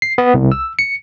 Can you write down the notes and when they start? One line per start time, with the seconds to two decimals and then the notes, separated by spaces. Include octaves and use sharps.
0.02 C7
0.18 B3
0.34 C2
0.52 E6
0.79 C#7